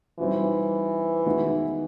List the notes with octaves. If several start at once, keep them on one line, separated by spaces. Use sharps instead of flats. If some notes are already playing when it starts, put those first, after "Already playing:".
E3 G3 C4 D#4 F#4
D#3 G#3 B3 D#4 F#4